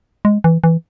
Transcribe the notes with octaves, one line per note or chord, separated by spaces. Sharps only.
G#3
E3
E3